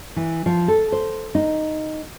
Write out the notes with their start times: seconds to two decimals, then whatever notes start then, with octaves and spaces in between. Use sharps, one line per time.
0.16 E3
0.46 F3
0.68 A4
0.92 C5
1.35 D#4